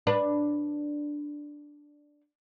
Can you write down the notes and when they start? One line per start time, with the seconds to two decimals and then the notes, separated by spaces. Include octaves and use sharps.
0.07 D4 B4